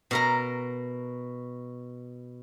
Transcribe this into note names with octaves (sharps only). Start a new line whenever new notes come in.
B2 A#4 A#5